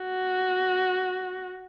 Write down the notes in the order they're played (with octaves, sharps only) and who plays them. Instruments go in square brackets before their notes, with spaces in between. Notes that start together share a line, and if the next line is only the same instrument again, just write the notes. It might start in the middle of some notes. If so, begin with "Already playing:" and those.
Already playing: [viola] F#4